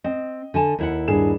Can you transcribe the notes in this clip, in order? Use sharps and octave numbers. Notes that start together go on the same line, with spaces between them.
C4 D#5
D3 G#5 A5
D#2 E4 F#5
G2 G#4 E7